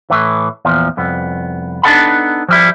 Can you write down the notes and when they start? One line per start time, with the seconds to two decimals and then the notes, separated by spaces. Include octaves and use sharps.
0.10 A2 E3
0.65 E2 A#2 F3
0.97 C2 F2 B3
1.83 B3 D4 D#4 A4 F#5 B5
2.49 F3 G3 E4